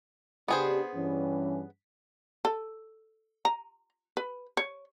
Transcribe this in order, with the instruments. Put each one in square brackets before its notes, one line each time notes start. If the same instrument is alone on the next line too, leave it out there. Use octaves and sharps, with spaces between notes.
[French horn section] C#3 D4 G4 [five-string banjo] B3 G#4 C5
[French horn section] G2 E3 C#4
[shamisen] A4
A#5
B4
C#5